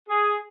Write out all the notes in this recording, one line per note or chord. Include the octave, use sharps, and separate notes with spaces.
G#4